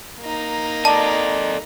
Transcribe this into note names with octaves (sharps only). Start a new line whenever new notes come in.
A#3 D#4
A4 D5 D#5 A5